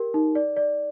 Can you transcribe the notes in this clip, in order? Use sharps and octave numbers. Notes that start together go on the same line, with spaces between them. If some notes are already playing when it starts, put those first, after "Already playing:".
Already playing: G4 A#4
D#4
D5
D5